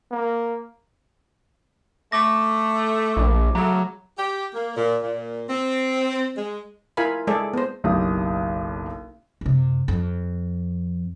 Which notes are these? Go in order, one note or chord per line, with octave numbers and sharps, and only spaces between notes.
A#3
A3 D6 A#6
A#1
C#3 F#3 A3 A#5
G4
A#3
A#2
A#2
C4
G#3
E4 F4 A#4 F5 G#5 B5
G#3 G#4 A4 D5 E5
B3 C5
F#1 B1 G4 D#6
F#2 C3
F2